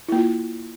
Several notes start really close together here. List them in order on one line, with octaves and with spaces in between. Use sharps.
E4 A#3 F4